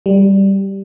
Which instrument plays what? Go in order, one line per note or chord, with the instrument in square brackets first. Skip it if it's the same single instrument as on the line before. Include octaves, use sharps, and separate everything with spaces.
[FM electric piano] G3